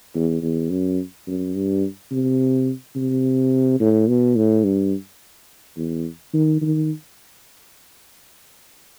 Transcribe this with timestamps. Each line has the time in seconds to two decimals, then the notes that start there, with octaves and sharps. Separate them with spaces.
0.15 E2
0.42 E2
0.70 F#2
1.27 F#2
1.55 G2
2.12 C3
2.95 C3
3.80 A2
4.08 B2
4.36 A2
4.64 G2
5.77 E2
6.33 D#3
6.61 D#3